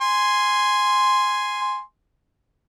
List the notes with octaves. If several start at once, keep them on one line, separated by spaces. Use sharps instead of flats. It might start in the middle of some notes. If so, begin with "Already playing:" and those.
G#5 C6